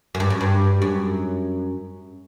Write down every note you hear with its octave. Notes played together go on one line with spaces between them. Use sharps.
F#2
G2
F#2
G2
F#2